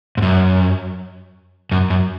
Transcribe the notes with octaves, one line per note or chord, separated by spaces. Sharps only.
G#2
F#2
F#2
F#2